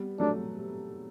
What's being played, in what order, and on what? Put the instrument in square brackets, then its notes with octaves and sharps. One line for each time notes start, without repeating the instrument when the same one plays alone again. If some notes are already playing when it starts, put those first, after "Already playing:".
Already playing: [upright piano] G3 B3
[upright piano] F#3 A3 [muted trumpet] D4